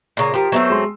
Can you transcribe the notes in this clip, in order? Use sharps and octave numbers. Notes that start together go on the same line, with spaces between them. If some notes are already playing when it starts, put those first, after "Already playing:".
A#2 C#3 A#5
F3 G4 A#4
F#3 A3 B3 C4 E6
G#3 C6